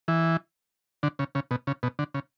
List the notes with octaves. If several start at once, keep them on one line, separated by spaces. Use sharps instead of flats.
E3
D3
C#3
C#3
B2
C#3
B2
D3
C#3